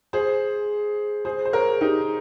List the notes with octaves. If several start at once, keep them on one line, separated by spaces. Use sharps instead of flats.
G#4 C5
G#4 C5
C5
A#4 C#5
D#4 G4